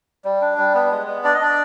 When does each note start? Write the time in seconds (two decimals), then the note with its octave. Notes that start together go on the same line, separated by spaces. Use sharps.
0.25 G3
0.41 D4
0.58 G3
0.75 B3
0.91 G#3
1.08 B3
1.24 D4 D5
1.34 D#5
1.41 D4 D5